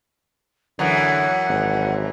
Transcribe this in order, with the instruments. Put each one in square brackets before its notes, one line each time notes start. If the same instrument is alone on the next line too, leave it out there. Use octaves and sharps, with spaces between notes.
[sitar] F#2 E3 [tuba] D3 [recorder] F#5
[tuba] G#1